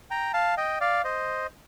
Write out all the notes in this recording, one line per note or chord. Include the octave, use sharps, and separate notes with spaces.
G5 A#5
F5 A5
D#5 G5
D5 F5
C5 D#5